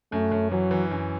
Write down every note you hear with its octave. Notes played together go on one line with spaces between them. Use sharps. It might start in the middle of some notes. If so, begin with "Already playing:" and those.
F#2 A3
F#2
E3 F#3
E3
F#2